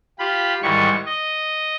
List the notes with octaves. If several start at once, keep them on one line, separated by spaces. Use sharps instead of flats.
F4 G4 B5
G#2 D#3 E3 G3 C#6
D#5